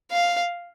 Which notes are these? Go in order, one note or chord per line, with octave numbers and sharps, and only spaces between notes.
F5